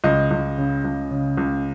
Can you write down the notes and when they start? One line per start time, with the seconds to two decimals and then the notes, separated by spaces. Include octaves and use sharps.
0.04 C#2 D#5
0.31 C#2
0.58 C#3
0.84 C#2
1.11 C#3
1.37 C#2